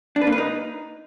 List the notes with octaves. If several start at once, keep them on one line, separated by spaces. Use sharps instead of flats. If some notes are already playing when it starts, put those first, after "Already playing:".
D4
B4
A#3
B4
D#4